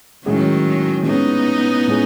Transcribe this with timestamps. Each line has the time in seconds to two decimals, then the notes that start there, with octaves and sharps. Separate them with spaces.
0.25 A2 D#3 F#3 G#3 C#4 G#4
1.06 A2 G#3 B3 C#4 D#4 G#4
1.88 A2 G#3 C#4 G#4